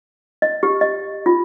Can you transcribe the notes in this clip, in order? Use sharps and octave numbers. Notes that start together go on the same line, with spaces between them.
D#5
G4
D#5
F4